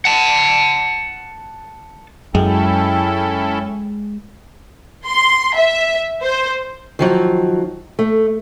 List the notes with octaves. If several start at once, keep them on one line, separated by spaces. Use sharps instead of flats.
F#5 A5
F#2 G#3 C#4 E4 A4 G5
C6
E5
C5
D#3 F3 F#3
A3